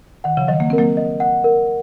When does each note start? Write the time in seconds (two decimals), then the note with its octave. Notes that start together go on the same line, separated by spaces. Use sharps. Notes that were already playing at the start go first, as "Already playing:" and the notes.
0.24 D#3 F#5
0.37 C#3 F3
0.48 D#3 F#3 D#5
0.60 A#3
0.70 C4 A#4
0.78 F#3 A#3
0.97 D#5
1.20 F#5
1.44 A#4